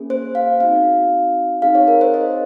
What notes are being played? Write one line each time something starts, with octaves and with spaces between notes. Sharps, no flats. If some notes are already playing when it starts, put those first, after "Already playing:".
Already playing: A#3 C#4 G#4
C5
F5
C4 D#4 F#4 F5
C4 D#4 G#4 F5
C#5
A#4
C5
D#5